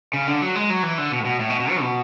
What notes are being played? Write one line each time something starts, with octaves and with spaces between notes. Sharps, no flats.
C#3
D3
F#3
G#3
F#3
E3
D3
B2
A2
B2
A2
B2
B2
F#3
B2